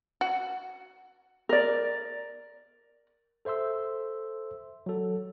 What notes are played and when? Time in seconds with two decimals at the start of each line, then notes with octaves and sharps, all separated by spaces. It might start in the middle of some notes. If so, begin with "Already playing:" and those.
0.21 F#4
1.49 A#4 D5
3.45 A4 C5 E5 C6 E6
4.86 F#3 A4